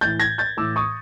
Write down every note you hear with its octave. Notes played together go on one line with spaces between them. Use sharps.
A2 E3 G6 A6
G#6 A#6
G6 A6
A2 E3 D6 E6
C#6 D#6